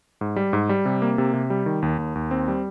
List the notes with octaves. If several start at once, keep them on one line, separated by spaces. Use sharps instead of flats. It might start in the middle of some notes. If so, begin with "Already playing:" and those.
G#2
G3
G#2
G3
C3
A#3
C3
C3
G3
D#3
D#2
D#2
D#2
C4
G3